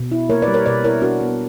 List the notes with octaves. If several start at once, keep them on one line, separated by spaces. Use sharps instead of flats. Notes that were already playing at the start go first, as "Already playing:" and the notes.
Already playing: B2
E4
A#3 A#4 C#5
B4 D5
G3
A#4 C#5
B2 B4 D5
E4 A#4 C#5
D4 F#4 A#4
B3